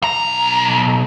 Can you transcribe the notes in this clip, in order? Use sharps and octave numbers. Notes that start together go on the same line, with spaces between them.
B1 A#5